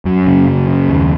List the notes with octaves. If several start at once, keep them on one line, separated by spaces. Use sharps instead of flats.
F#2 F#3
C#3
F#2
C#3
D#2